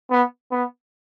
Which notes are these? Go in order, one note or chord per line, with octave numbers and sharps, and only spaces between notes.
B3
B3